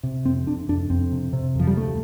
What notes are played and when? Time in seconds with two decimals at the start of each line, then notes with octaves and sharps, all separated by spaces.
0.03 C3
0.25 F2 C4
0.47 C3 D4
0.69 F2 D4
0.90 F2 C4
1.12 C3
1.33 C3
1.55 F2 F3
1.67 G3
1.76 D2 A3